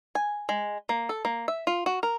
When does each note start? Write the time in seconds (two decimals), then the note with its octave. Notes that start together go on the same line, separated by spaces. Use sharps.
0.15 G#5
0.49 G#3
0.89 A#3
1.09 A4
1.25 A#3
1.48 E5
1.67 F4
1.86 F#4
2.03 A#4